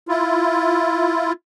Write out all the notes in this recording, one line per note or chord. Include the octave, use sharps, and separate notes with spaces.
E4 F4